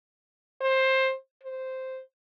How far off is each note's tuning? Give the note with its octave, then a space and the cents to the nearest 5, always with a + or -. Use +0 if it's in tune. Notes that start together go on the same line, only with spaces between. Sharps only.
C5 +15
C5 -5